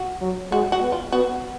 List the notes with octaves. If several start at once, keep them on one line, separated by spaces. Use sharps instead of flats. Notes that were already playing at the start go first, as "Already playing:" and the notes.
Already playing: F#4
F#3
G#3 F#4
F#4
B3
F4
B3 F#4